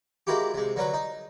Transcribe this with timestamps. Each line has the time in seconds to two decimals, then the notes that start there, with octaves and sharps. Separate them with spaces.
0.27 G#3 A#3 E4 F#4 G4
0.54 C3 G#3
0.76 D3 F#3 A#4 B4
0.94 D#4